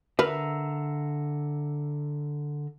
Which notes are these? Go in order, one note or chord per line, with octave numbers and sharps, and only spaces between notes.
D3 A#4 B4 E5 A#5